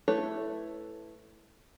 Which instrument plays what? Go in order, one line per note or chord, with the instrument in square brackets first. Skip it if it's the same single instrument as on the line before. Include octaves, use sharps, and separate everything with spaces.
[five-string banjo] A3 E4 B4 C#5